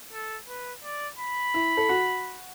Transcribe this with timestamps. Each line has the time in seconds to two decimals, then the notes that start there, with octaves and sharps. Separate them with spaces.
0.13 A4
0.48 B4
0.84 D5
1.19 B5
1.54 E4
1.77 A4
1.89 F#4